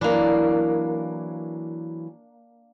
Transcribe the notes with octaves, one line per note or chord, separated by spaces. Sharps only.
E3 F#3 A#3 D4